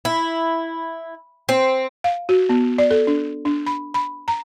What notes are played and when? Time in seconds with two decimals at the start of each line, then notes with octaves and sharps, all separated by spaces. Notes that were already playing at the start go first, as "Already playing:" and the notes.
0.05 E4
1.49 C4
2.04 F5
2.29 F#4
2.49 B3
2.78 D5
2.91 A4
3.07 D4
3.45 D4
3.66 B5
3.94 B5
4.28 A#5